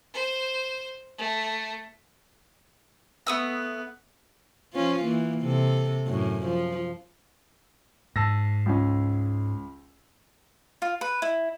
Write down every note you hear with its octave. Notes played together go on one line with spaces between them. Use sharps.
C5
A3
A3 B3 D#6 E6
F3 C#4 F4
E3 A#3
C3 A4
F#2 A2
F3
G#2 A5 E6 A#6
C#2 C#4
F4
B4
E4